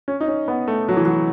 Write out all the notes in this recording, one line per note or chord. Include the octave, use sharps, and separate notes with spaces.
C#4
D#4
C#4
B3
A3
F#3
E3
F#3